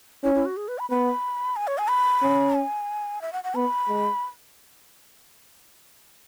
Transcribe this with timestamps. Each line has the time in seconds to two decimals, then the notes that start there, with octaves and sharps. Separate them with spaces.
0.24 C#4 E4
0.35 E4
0.46 F#4
0.57 G#4
0.68 B4
0.79 B5
0.90 B3 B5
1.56 G#5
1.67 C#5
1.78 G#5
1.89 B5
2.22 C#4
2.56 G#5
3.22 E5
3.33 F#5
3.44 F#5
3.55 B3 B5
3.88 G#3